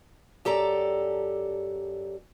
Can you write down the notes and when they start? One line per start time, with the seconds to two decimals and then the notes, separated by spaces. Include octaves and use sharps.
0.45 F#2 G4 A4 D5 A#5